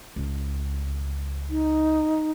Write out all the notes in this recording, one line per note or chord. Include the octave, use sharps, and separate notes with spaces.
C#2
D#4